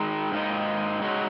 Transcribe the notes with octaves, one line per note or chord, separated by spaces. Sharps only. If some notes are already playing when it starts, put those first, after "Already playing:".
Already playing: D#3 G#3 D#4 A#4
G#2 D#3 A#3 D#4
G#3 D#4 F#4 C#5